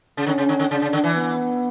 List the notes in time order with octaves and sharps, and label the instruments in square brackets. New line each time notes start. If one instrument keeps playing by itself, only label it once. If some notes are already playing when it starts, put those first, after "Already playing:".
[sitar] C#3
[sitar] D3 [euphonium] C#4
[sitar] C#3
D3
D3
[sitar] C#3 [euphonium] D4
[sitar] C#3
D3
E3
[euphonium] B3